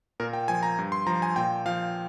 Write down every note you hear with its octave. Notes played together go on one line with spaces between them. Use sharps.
A#2 A#4
G5
F3 G#5
A#5
G2
C6
F3 A#5
G#5
A#2 G5
F3 F5